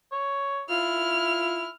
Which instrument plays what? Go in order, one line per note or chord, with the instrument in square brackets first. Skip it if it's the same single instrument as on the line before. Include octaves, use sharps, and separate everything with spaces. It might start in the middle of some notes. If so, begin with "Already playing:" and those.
[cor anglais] C#5
[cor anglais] E4 [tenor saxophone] F4 [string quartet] F6